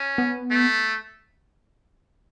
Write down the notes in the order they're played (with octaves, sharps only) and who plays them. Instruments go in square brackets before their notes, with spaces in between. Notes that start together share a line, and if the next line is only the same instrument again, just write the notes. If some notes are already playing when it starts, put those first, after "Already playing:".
Already playing: [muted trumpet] C#4
[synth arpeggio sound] B3
[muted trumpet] A3